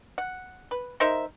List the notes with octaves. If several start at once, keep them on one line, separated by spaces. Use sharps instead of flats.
F#5
B4
D#4 A#4 C5 E5